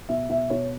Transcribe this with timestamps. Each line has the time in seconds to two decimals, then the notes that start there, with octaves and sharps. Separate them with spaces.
0.09 B2 E5
0.30 B2 E5
0.50 B2 C#5